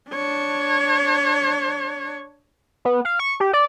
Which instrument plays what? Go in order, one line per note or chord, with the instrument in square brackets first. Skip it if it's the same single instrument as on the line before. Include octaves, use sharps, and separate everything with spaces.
[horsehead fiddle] D4 C#5
[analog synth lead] B3
F5
C#6
G4
D5